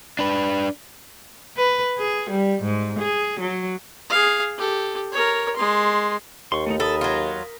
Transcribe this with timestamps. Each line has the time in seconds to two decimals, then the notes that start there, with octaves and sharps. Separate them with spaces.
0.19 D4 B4
1.57 B4
1.98 G#4
2.30 G3
2.63 G#2
2.99 G#4
3.40 F#3
4.10 G#4 F5
4.58 G4 A4
5.12 A#4 C#5
5.56 G#3 C6
6.52 D#2 C6 C#6
6.66 A3 B3 D#4
6.80 A4 A#4 B5 D#6
7.01 F#3 F4